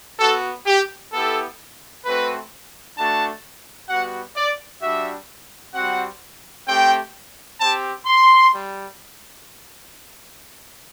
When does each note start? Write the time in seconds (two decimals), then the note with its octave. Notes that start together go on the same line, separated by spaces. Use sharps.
0.19 B3 F#4 A4
0.66 G4
1.12 B3 E4 G4 A4
2.05 A3 C4 F#4 B4
2.97 A3 D4 F#4 A5
3.89 G3 B3 F#4 F#5
4.36 D5
4.82 G3 D4 F#4 E5
5.75 G3 C4 F#4 F#5
6.67 A3 C4 G4 G5
7.60 C4 G4 A5
8.06 C6
8.52 G3